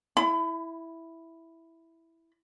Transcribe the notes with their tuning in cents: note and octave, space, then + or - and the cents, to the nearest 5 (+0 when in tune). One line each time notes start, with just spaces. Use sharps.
E4 +0 B5 +30